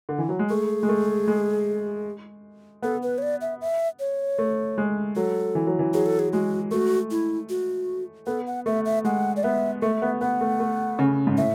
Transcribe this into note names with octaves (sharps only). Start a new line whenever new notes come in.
D3
E3
F#3
G#3
A3 G#4
G#3
A3
G#3
B3 A4
B4
C#5
D5
E5
E5
C#5
A3
G#3
F#3 A4
E3
F#3
E3
F#3 G#4
A4
G#4
G#3 F#4
A3 F#4
E4
F#4
B3 A4
F#5
A3 E5
E5
G#3 F#5
D5
B3 E5
A3 E5
B3
B3 F#5
A3
A3
C#3
G#2
A2 E5